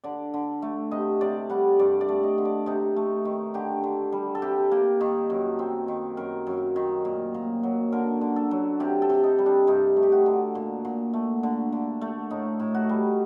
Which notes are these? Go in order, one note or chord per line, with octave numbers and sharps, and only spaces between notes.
D3 D5
D3
A3
C3 D#5
C3 D5
G3 F#5
G2 D5
D5
A3
D#5
D3
D5
C3 D#4
A3
D#3
D3 G4
D3
G3
A4
C3 G4
A#3
D#3
F#2
C4
D#3
F#2 A#4
F#2
D#3
A#2
A#2
F#3
D3 A#4
D3
A4
F#3
C3 G4
A4
C3
D#4
G3
D4
G2 D#4
A3
G4
F#4
D3
A#2
A#2
A3
D3
D3
A3
A2 D#4
A2
F#4
G3